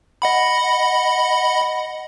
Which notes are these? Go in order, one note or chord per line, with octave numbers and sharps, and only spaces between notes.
D#5 F#5 B5